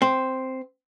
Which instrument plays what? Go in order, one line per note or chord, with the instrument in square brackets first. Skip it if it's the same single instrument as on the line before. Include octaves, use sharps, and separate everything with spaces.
[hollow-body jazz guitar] C4